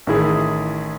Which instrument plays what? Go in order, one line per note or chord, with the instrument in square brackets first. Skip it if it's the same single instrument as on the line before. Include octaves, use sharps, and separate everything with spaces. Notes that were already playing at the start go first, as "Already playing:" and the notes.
[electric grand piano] A1 D#3 E4 G#4